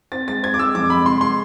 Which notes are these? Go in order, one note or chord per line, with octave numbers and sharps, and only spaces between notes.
C4 A6
G#3 A6
C4 G#6
D6
G#3 E6
F2 D6
G#3 B5
C3 C6
G#3 C6